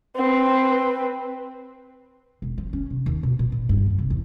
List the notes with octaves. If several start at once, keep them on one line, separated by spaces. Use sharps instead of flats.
C4 B4
E1
F3
C#4
C3
D#2
B2
A#2
A#2
G2
E2
C3
E2